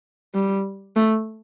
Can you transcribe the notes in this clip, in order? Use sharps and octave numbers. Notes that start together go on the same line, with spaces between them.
G3
A3